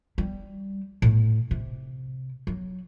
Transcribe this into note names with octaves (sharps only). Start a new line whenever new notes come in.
G3
A2
C3
F#3